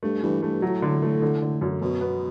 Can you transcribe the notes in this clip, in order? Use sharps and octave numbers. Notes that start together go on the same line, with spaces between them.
G2 A3
G2 E3
G2 A3
A2 F#3
D3
A3
D3
D3
F#2
F#2 B2
B3